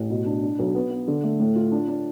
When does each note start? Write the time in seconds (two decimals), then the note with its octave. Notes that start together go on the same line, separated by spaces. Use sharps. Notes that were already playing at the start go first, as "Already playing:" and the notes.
Already playing: A1
0.10 B2
0.26 D4
0.42 D4
0.59 B1
0.75 B3
0.91 B3
1.07 D3
1.23 A3
1.40 A2
1.56 F4
1.72 D4
1.88 D4